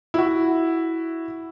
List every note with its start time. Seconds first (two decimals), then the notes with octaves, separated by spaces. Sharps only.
0.14 E4 F#4